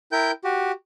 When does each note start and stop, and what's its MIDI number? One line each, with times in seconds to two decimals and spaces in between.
0.12 0.31 64
0.12 0.31 70
0.12 0.31 79
0.12 0.31 91
0.44 0.72 66
0.44 0.72 67